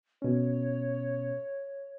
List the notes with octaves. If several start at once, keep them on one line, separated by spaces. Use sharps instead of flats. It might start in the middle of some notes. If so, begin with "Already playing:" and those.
B2 C#4 C#5